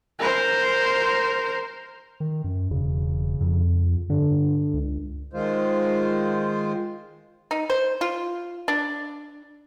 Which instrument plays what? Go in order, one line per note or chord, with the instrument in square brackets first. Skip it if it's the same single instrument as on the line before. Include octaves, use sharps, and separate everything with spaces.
[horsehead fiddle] A#4 C5
[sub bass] D#3
F#2
[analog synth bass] E1 [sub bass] C#3
[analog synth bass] F2
[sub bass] G2 [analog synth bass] D3
[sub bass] C#2
[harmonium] D#3 G#3 F4 C5
[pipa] D#4
C5
F4
D4